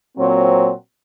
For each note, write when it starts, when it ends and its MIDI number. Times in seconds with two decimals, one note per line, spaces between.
0.18 0.72 46
0.18 0.72 54
0.18 0.72 60